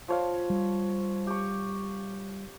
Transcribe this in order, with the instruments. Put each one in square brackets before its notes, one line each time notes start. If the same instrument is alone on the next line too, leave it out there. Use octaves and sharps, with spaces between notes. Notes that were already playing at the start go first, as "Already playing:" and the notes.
[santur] F3 C#5 F5
[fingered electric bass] G3
[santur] G4 C#6